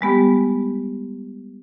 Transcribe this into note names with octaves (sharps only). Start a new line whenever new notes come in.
G3 G#3 B3 G4